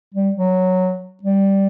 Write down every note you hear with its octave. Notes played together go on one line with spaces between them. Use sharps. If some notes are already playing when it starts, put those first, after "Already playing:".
G3
F#3
G3